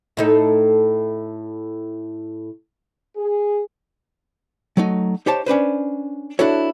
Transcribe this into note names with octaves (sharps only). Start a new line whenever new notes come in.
A2 D#4 A4
G#4
F#3 A3 D#4
D#4 G4 C5 C#5 A5
C#4 D4 B4 C5
D4 E4 F#4 A4 C#5